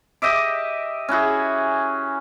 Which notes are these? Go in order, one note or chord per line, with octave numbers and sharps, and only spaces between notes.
G4 D#5 E5 D6
C#4 E4 F#4 G#4